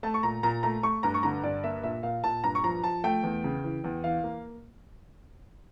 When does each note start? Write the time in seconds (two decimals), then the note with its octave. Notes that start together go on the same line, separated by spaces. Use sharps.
0.03 A3 A5
0.14 C#6
0.23 A#2 A#5
0.43 A#2 A#5
0.63 A3 A#5
0.83 A3 C#6
1.03 G2 A#5
1.14 C#6
1.23 D3 A#5
1.43 G2 D5
1.64 A#3 E5
1.83 A#2 E5
2.03 A#2 F5
2.24 A#2 A5
2.43 G2 A#5
2.55 C#6
2.64 F3 A#5
2.84 F3 A5
3.04 A3 G5
3.23 E2
3.44 C#3
3.64 E3
3.84 E2
4.04 E3 F5
4.24 A#3